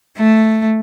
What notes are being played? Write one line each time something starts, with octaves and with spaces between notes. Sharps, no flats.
A3